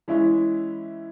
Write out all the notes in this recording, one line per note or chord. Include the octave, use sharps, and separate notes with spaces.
E3 G#3 C#4 E4